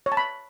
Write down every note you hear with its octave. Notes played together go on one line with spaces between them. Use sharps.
C#5
A5
B5